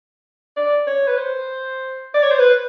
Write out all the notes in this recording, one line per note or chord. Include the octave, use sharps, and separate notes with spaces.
D5
C#5
B4
C5
D5
C#5
C5
B4